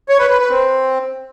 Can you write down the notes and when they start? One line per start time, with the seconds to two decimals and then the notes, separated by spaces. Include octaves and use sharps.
0.09 C#5
0.19 B4
0.29 B4
0.39 B4
0.49 C4